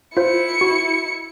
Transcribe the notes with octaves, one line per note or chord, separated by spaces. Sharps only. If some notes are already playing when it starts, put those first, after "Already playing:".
E4 F4 C5 C#7
F#4